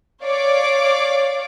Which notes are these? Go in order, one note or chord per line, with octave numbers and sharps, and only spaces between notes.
C#5 D5 F5 D6